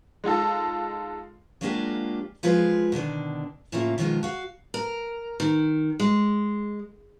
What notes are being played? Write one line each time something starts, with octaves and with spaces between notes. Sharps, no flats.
G#3 D#4 F4 A4
F#3 G#3 A#3 D4 F4 G4
F3 G#3 F4 G#4 B4
B2 D3 D#3 D4
A2 C#3 A#3 F4 D#5 E5
B2 D#3 F3 G#3 F4
F#4 F5
A#4
D#3
G#3